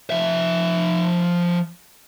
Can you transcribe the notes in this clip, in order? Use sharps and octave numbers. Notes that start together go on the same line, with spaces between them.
F3 E5